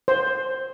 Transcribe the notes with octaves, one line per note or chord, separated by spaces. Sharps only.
C5